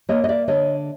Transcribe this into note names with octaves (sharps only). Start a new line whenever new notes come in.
A#3 C#5 D#5
D#5
D5 E5
D3 C#5 D#5